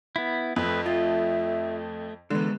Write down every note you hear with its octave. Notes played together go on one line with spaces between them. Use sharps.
B3 E4
F2 A3 B4
A3 F4 E5
D3 E3 G#3 B3